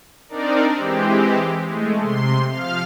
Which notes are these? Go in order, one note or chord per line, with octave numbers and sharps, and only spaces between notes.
C4 D4 D#4 A#4 D5
E3 G#3 C4 G4
G#3 A3
C3 C6
F3 F5 F6